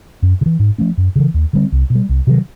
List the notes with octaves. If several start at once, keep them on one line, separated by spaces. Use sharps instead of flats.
F#2
C#3
E3
G#2
F3 A3 C#4
F#2
C#3 E3
D#2
D3 G3 C4
C2
B2
G3
C2
C3 D#3 F#3